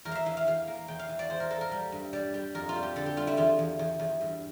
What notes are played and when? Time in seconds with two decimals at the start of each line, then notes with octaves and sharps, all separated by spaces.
0.05 E2 A#4
0.12 E5 F5
0.26 E3 E5
0.37 F5
0.47 E2 F5
0.67 A#3
0.88 E2 G5
0.99 F5
1.09 E3
1.19 D5
1.30 E2 C5
1.40 A#4
1.50 A#3 A4
1.61 A#4
1.71 G3
1.92 G2
2.13 G3 D5
2.34 G3
2.55 F2 A#4
2.69 F4
2.76 G3
2.83 G4
2.96 D3 A4
3.06 G4
3.17 G3 F4
3.27 E4
3.37 E2 F4
3.59 E2
3.79 E2
4.00 E2
4.21 G2